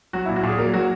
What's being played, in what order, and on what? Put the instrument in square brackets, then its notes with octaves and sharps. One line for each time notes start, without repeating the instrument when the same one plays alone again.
[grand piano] F#3 F#4
E4
A#2
F#4
A#2 G#4
F#3 A#4
F#3 F#4